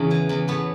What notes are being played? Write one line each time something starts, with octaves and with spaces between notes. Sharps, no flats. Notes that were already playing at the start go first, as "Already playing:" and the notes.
Already playing: E2 C#3 C#4 E4
E3
E2
A2 B3